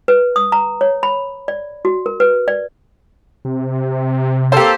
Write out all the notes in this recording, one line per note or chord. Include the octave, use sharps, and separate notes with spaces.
B4
D#6
A#5
C#5
B5
D5
F#4
A#4
B4
D5
C3
A#3 C4 G4 A4 C5